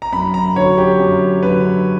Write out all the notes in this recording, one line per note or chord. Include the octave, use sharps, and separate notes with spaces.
A#5
F#2 B5
A#5
D3 F#3 C#5
G4
F#2
D3 F#3 B4